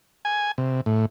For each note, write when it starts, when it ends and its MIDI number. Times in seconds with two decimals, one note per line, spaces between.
0.25 0.52 80
0.58 0.81 48
0.86 1.05 45